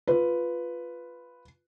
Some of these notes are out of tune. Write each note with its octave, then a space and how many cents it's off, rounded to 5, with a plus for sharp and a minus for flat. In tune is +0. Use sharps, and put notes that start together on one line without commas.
F4 +0 B4 +0